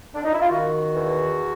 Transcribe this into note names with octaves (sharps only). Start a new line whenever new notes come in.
D4
D#4
E4
F4
D#3 F#4
E2